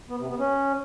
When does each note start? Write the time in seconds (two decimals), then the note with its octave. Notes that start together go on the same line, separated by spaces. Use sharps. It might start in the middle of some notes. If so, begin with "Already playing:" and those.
0.10 B3
0.19 C3
0.29 B3
0.39 C#4